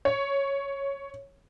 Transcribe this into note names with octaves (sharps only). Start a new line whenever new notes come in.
C#5